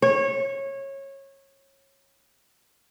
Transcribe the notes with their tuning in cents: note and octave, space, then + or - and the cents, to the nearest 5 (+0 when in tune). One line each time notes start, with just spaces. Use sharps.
C#5 -20